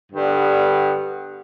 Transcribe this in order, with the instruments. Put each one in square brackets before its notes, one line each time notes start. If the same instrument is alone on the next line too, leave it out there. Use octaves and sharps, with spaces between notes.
[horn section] G2 D3 G3 B3